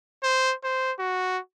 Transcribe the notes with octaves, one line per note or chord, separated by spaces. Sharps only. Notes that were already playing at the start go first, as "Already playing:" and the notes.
C5
C5
F#4